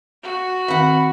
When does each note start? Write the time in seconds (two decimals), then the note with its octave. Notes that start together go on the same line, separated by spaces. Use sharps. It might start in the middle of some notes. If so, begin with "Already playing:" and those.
0.23 F#4
0.68 D#3 C4 B4 E5 F#5 B5